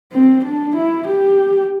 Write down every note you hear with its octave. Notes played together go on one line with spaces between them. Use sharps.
C4
D4
E4
G4